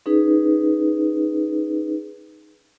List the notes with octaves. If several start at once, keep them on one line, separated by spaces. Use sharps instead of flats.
C#4 D#4 G#4 B4